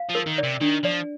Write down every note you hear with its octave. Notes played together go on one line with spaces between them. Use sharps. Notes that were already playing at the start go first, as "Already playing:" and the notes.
Already playing: F5
F3
A#4
D#3
D5
C3
D#3 D4
F3 D5